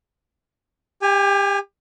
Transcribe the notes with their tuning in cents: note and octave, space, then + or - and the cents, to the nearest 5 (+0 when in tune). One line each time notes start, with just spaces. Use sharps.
G4 +25 G#5 -20